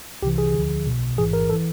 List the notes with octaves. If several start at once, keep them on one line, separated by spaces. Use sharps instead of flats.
C2 C3 E3 G4
G#4
D2 D3 F3
B1 B2
A1 G#2 E3 G#4
A#4
A4
E3